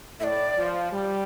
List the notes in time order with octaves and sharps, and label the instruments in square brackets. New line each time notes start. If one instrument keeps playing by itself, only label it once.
[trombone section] A2 [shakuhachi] E5
[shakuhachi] D5
[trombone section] F3
G3